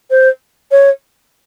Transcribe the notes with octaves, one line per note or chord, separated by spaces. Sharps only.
C5
C#5